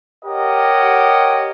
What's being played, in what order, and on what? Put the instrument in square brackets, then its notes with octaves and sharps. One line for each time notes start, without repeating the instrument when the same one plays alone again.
[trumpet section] G4 A#4 C#5 D#5 F#5